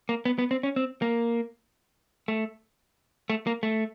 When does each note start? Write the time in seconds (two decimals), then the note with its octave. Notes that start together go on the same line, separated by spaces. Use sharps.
0.09 A#3
0.25 B3
0.38 B3
0.51 C4
0.63 C#4
0.76 C4
1.02 A#3
2.28 A3
3.30 A3
3.47 A#3
3.63 A3